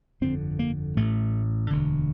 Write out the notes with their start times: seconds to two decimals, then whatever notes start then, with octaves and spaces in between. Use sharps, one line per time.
0.21 G1 F2 D3 C4
0.59 A#3
0.97 A1 A2 A3
1.70 E1 D2 D3